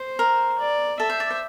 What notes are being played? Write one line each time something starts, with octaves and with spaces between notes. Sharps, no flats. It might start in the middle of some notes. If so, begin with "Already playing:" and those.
Already playing: C5
A#4
D5
A4 E5
C5
D5
C5